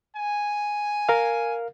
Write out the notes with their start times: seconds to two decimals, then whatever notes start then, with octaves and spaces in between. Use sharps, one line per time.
0.16 G#5
1.09 A#4 F5